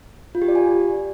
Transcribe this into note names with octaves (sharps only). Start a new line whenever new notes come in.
F4
G4
D5
G#5